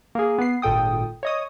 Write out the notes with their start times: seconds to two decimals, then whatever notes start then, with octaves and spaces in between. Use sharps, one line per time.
0.15 A#3 G#4
0.39 B3 C7
0.62 G#1 A#2 A4 G5 D#6
1.23 C#5 D#5 D#6